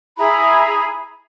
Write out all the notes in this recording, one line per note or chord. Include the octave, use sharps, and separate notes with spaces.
E4 G#4 A#5 B5